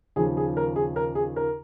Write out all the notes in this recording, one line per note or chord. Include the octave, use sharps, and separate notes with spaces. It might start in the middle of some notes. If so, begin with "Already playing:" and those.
D#2 C#3 F3 G#4
G#4
A#4
G#4
A#4
G#4
A#4